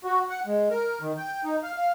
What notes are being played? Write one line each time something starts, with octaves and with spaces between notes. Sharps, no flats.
F#4
F#5
G#3
A#4
D#3
G5
D#4
F5
F5